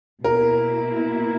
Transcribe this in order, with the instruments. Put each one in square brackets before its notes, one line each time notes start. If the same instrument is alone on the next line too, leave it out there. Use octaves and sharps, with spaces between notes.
[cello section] B2 A#3 E4 [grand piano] A#4